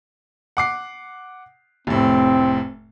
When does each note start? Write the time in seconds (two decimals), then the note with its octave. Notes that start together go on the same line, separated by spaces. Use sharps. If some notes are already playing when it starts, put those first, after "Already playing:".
0.57 F#5 D6 C7
1.87 F1 A2 C4